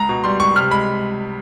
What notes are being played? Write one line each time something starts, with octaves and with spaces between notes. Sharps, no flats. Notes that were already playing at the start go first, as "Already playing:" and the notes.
Already playing: C#2 A#5
B2
G3 C6
C#2 C#6
C3 F6
G#3 B5